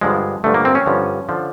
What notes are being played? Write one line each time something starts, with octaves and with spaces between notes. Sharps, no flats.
G2 D3 F3 G#3
G2 D3 F3 A3
A#3
C4
C#4
G2 D3 F3
D3 F3